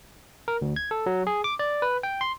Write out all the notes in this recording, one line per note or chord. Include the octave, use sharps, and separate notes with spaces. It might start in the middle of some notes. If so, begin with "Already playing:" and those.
A#4
D2
G#6
A4
F#3
G#4
D6
D5
B4
G5
C6